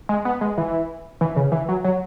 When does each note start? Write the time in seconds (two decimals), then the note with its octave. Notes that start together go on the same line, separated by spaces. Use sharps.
0.09 G#3
0.25 B3
0.41 G#3
0.58 E3
1.21 E3
1.36 C#3
1.52 E3
1.69 F#3
1.84 F#3